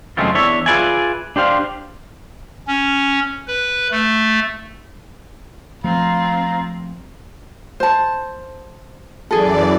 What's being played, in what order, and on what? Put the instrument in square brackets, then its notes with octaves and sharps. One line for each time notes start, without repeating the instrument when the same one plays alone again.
[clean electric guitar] F#2 C#3 G#3 A3 C4 F4
E2 D4 C#5 E5
F4 G#4 B4 D5 E5 G#5
D4 G4 C5 F5
[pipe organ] C#4
B4
A3
[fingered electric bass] F3 A3 [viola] C4 F4 [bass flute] F5 [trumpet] A#5
[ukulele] C5 A5
[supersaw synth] F#2 E3 D5 [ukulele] G#4 A4